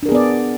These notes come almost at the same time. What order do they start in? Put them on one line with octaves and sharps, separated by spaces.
D4 A#4 G#4 B3 D5